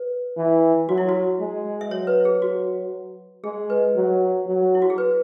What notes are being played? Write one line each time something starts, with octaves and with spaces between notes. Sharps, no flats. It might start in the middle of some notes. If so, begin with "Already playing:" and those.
Already playing: B4
E3
F#3 F#4
E4
F#4
G#3
E5
F#3 C#5
B4
G#4
F#4
G#3 G#4
B4
F#3
F#3
E4
F#4
G#4
B4